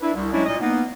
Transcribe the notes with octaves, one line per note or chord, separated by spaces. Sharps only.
D4 E4 B4
C2
F#3 G#3 C#4 D4 E4
A#2 D#5
A#3 B3 D#4